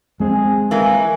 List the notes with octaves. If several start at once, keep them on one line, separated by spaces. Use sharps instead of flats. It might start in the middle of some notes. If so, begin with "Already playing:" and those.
G#3 C4 G#4
E3 A#3 G#5